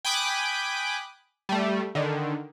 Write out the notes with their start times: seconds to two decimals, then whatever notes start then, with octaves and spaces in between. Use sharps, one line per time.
0.05 G5 G#5 B5 D6 D#6 F#6
1.49 G3 A3
1.95 D3 D#3